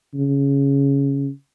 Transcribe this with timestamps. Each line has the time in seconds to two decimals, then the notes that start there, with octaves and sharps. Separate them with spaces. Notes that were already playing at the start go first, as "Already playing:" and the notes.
0.15 C#3